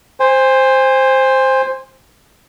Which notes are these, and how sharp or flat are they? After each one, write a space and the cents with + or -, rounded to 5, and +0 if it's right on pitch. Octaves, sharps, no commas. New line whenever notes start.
C5 +5 G#5 -30